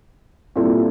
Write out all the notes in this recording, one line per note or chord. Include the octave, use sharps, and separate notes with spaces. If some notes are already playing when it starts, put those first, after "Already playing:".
A#2 G3 C4 E4 A4